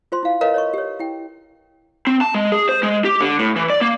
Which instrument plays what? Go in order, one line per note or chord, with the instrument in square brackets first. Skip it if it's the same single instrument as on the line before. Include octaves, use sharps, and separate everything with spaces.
[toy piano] F4 C5 C6
E4 F5
A#4 B4 C#5 D#5 F5 A#5
C#5 D#5 C#6
G4 C#5
E4 G5
[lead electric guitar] C4
A5
G#3
G#4
C5
G#3
G4
D3
A2
E3
D5
A#3